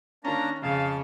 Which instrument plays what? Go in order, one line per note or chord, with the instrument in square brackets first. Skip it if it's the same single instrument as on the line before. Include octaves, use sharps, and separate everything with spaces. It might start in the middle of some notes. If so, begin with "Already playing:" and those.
[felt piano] D#3 C#4 [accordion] A#3 D4 [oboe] A#5
[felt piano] F2 [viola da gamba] C#3 [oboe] F5 [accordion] A5